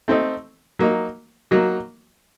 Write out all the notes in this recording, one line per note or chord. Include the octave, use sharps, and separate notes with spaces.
A3 C4 D#4
F#3 A#3 D#4
F#3 A#3 D#4 F#4